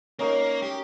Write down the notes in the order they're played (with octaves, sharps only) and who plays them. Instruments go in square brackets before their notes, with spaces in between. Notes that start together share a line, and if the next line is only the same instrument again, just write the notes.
[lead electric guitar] A#3 [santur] C#4 D#4 A#4
[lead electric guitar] G4